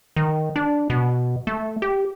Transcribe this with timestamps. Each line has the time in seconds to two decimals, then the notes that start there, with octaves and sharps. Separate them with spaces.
0.16 D#3
0.56 D4
0.90 B2
1.47 A3
1.82 G4